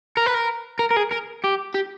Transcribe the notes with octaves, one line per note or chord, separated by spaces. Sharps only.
A#4
B4
A#4
A#4
A#4
G#4
A#4
G4
G4